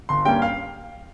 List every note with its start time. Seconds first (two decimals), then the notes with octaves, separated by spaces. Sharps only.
0.09 G1 C6
0.25 G2 G3 A#3 C#4 G5
0.42 F5